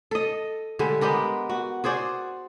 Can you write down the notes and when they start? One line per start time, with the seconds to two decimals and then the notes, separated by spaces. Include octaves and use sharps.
0.11 A4 D#5
0.79 D3 G3 G#3
1.01 G#3 B3 G4 A#4
1.50 F#4
1.84 F#4 G#4 C5 D5